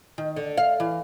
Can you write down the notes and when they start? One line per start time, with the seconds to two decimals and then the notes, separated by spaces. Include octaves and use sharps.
0.18 D#3
0.36 D3
0.57 F5
0.80 E3